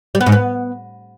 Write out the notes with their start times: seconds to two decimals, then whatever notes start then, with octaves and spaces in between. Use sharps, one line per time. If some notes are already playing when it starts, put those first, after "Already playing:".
0.15 G3
0.21 B3
0.26 G#2
0.32 B3